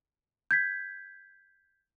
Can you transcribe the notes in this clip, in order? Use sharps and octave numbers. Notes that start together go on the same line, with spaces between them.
G6 G#6 B6